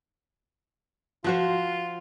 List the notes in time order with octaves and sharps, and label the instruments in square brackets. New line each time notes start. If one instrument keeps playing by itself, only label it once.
[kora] F3 F#4 C5 [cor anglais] F4